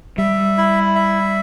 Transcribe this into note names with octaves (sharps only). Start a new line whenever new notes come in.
G3 E5
E4
E5